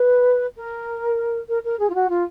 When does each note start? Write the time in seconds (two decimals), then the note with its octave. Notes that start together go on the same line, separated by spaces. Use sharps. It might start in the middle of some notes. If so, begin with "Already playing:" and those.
Already playing: B4
0.56 A#4
1.49 A#4
1.63 A#4
1.79 G#4
1.90 F4
1.94 F#4
2.10 F4